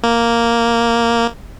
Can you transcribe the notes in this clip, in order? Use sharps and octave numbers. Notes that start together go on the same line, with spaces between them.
A#3